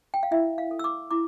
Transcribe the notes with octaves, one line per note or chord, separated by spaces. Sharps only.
G5
F5
E4 E5
F5
A4
E6
D6
E4 D6